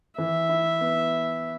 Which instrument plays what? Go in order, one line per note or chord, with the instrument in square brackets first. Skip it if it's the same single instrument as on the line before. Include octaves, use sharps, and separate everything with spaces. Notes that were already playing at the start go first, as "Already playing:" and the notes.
[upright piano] E3 [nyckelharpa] E5
[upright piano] E4
B3